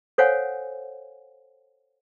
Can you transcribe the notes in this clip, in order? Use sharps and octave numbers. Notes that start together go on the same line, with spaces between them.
A4 C5 C#5 F5 F#5 G#5